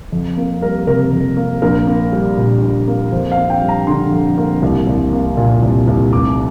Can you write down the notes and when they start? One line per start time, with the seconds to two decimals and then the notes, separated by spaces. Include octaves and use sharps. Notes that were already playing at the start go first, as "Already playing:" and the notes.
0.12 F2
0.38 A#3
0.62 G3 A#4
0.87 C3 A#4
1.13 F2
1.37 A#3
1.62 A#1 A#4
1.87 A#3
2.13 G3
2.38 A#2
2.62 A#1
2.88 A#3
3.12 F2 C5
3.32 F5
3.38 A#3
3.50 G5
3.62 G3
3.69 A#5
3.87 D3 C6
4.12 F2
4.38 A#3
4.62 C2
4.87 C2
5.13 A#3
5.37 A#2
5.62 C2
5.87 C2
6.12 F1 D6